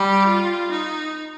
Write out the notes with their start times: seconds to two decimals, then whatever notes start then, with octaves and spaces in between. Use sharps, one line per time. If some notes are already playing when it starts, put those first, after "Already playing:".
Already playing: G3 G4
0.27 F4
0.71 D#4